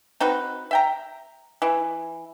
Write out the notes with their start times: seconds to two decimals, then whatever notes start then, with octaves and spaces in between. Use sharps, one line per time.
0.20 C4 D#4 F#4 B4
0.71 E5 G5 A#5
1.62 E3 E4